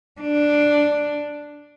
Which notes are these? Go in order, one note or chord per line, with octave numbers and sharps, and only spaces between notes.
D4